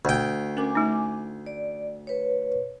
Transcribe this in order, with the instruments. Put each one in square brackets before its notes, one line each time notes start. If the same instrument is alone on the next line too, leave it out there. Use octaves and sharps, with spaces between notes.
[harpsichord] D2 G5
[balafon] C#4 A#4 [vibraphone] G#5 D6
[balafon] A3 D#4
[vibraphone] D5
B4 C#5